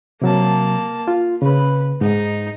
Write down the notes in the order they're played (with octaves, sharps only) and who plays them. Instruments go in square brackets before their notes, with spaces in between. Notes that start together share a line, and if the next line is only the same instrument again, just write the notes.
[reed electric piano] C3 F#3 [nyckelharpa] A#3 A5
[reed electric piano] F4
[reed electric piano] C#3 [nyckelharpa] B4 B5
[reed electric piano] G#2 [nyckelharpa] D#4